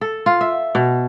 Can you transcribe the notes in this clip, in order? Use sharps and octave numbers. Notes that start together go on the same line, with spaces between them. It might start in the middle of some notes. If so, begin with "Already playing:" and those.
A4
F4
E5
B2